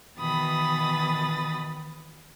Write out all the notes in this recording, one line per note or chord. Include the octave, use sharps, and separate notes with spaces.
B2 D#3 E3 B5 D#6 A6